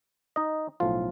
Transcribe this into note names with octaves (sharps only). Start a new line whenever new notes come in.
D#4 D#5
B1 A2 F3 F4 F5